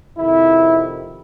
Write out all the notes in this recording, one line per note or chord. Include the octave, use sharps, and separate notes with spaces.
F2 C3 D#3 E4